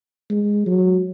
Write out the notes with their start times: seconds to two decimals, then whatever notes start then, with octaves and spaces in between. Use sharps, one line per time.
0.30 G#3
0.67 F#3